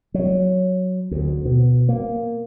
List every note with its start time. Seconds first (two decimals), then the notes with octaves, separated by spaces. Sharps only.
0.14 F#3
1.11 D2
1.45 B2
1.89 A#3